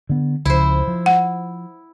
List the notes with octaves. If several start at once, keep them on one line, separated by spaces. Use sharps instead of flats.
D3 B3
C#2 C#3 F3 E4 C5
F3
F#5